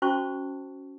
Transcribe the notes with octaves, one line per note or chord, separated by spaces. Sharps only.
C#4 F#4 C5 A5 C#6